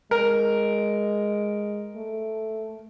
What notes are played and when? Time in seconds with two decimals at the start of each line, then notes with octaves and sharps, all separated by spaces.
0.11 G#3 A#4
1.96 A3